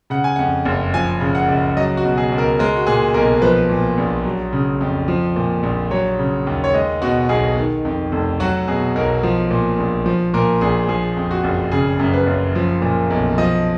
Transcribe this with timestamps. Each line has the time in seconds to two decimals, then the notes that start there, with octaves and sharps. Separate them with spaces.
0.10 C#3 F#5
0.24 G#5
0.36 F2 F#5
0.65 F#1
0.94 F3 G#5
1.21 C#3
1.35 F#5
1.48 C#2
1.77 F#3 D#5
1.97 F#4
2.04 B2
2.18 G#4
2.32 C#2
2.38 A#4
2.59 G#3 A#4
2.76 F#4
2.87 A#2 G#4
3.14 B1 A#4
3.42 F3 B4
3.69 A#2
3.98 A#1
4.25 F#3
4.53 C#3
4.81 F2
5.08 F3
5.36 A#2
5.63 A#1
5.91 F#3 C#5
6.19 C#3
6.47 D#2
6.64 C#5
6.74 G#3 D#5
7.02 B2 F#4
7.29 B1 G#4
7.57 D#3
7.85 F2
8.12 F1
8.40 F#3 F#4
8.68 B2 G#4
8.95 B1 A#4
9.23 F3
9.51 A#2
9.78 A#1
10.06 F3
10.34 A#2 A#4
10.61 A#1 G#4
10.88 F3 G#4
11.17 F2
11.31 F#4
11.44 F#1
11.72 C#3 G#4
11.99 F#2
12.13 B4
12.27 F#1
12.55 F3
12.82 A#2
13.10 B1
13.38 F3 D#5